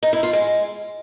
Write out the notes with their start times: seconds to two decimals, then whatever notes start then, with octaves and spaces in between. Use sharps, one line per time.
0.03 D#4
0.13 E4
0.23 F4
0.33 G#3